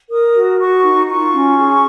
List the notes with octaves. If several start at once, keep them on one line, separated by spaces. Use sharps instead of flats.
A#4 D#6
F#4
F#4 C#6
D#4
F4 C#6
C#4
G#4